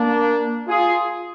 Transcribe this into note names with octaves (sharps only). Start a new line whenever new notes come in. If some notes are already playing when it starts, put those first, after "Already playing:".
Already playing: A#3 D4
F4 G#4